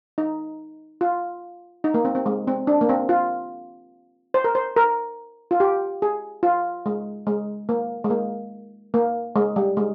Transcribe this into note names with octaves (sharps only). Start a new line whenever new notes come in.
D#4
F4
D#4
A#3
C4
C4
G#3
C4
D4
A#3
C4
F4
C5
A#4
C5
A#4
F4
G4
G#4
F4
G#3
G#3
A#3
G#3
A#3
A#3
G#3
G3
G#3